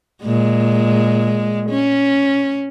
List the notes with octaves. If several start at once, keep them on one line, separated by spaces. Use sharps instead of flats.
A#2 G#3
C#4